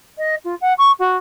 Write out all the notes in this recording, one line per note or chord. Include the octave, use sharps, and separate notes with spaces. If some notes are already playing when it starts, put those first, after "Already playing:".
D#5
F4
F#5
C#6
F#4